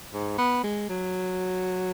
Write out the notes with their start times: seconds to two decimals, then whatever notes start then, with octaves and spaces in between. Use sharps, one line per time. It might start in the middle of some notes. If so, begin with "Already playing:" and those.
0.13 G#2
0.38 B3
0.64 G#3
0.89 F#3